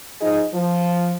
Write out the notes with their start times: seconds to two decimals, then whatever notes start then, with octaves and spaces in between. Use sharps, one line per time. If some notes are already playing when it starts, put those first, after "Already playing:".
0.20 F3 D#4 G#4 D#5
0.53 F3